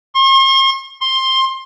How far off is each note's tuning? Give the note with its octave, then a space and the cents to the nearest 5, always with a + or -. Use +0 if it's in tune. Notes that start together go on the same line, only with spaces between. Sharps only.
C6 +45
C6 +15